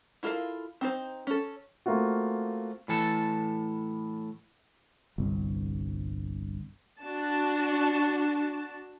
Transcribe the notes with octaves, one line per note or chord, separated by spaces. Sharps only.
E4 F4 A4 A#4 F5
C4 D#4 C5
C#4 A4
A3 A#3 C4 F4 F#4
A2 E3 A4 A5
G1 C2
D4 F#4 A5